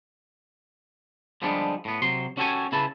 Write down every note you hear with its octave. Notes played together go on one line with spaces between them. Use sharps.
D3 F3 G3 G#3 B3 D4
A2 B3
C3 F#3 C6
C#4 F#4 G4 A4 C#5 G#5
C#3 E4 B4 A5